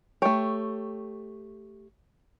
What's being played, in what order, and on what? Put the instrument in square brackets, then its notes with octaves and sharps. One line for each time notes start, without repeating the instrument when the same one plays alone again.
[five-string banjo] A3 G4 [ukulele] C#5